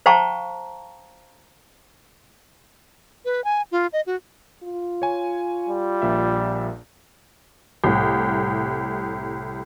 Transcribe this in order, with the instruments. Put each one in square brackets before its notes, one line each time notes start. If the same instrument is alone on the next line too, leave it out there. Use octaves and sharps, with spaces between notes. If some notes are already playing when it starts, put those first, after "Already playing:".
[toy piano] C5 F5 G5 A5 A#5 C#6
[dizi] B4
G#5
F4
D#5
F#4
[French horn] F4
[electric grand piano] C#5 G#5
[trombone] G3
[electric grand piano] A#1 A#2 E5
[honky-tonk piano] C2 A2